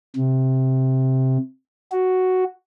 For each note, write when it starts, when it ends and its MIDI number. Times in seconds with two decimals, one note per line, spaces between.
0.17 1.38 48
1.92 2.44 66